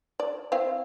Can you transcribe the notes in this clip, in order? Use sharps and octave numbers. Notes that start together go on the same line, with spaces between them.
D5
C4 E4 F5